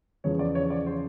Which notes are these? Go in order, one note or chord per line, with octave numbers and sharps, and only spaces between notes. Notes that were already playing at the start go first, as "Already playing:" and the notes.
E2 C#3 F3 C#5
D5
C#5
D5
C5